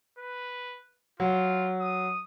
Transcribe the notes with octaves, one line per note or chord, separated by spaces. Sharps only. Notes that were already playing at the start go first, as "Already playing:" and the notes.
B4
F#3 F4
D#6